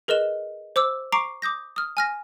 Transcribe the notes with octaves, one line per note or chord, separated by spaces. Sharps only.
G#4 A#4 B4 D#5 E7
C5 D6 E6
A#5 C#6 D6 C7 D7
D6 D#6 G6 A#6
D#6 F6
G#5 F6 A#6